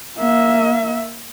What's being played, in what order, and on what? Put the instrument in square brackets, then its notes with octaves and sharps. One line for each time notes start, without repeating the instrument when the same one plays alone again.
[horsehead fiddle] A#3 E5